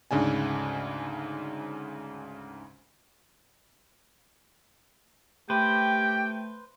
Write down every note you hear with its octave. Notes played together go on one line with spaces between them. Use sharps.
D2 G#2 C#3 D4 G#5
A3 G4 B4 C5 G5